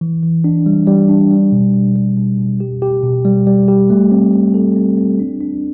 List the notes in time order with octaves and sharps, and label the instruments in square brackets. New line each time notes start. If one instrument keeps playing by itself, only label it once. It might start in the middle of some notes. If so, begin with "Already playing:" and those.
[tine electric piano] E3
E3
D4
G3
G3
D4
G3
B2
B2
G3
B2
B2
G4
G4
B2
G3
G3
G4
A3
C4
A3
A4
C4
C4
D4
D4